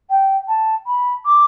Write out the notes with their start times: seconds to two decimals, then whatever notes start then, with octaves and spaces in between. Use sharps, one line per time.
0.10 G5
0.48 A5
0.86 B5
1.25 D6